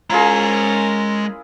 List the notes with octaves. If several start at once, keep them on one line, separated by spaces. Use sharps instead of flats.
G#3 C#4 E4 F4 G#4 A#4 A#5